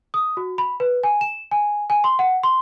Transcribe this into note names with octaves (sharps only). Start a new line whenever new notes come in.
D#6
F#4
B5
B4
G#5
E7
G#5
G#5
C6
F#5
C6